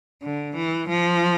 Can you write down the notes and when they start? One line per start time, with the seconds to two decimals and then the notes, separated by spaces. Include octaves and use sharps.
0.23 D3
0.56 E3
0.89 F3